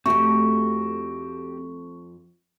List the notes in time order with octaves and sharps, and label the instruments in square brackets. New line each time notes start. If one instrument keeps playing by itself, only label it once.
[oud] F2 A3 [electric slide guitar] C4 F#4 G4 [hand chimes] C#6